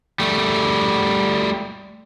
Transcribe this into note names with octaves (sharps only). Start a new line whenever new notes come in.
G3 A3